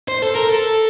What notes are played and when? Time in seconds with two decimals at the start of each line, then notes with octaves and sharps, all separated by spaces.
0.08 C5
0.22 A4
0.35 A#4
0.50 A4